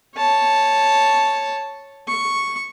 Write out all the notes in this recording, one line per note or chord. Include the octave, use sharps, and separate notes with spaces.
C#5 A5
C#6